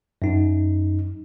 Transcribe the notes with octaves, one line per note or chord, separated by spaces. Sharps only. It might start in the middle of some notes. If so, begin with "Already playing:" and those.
F#2 D#4